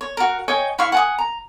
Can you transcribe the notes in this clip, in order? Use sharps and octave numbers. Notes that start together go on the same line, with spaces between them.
C#5
F#4 A#4
C#5 D#5 G5 G#5
E4 F5 C#6
F#5 G#5 D#6
A#5